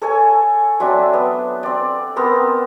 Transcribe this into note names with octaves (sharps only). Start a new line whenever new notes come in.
A4 C#5 G#5
F#3 C4 D4 E5
B3
C4 D5
B3 C4 A#4